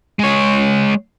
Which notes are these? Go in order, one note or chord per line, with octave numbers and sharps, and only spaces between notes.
G#3 C#5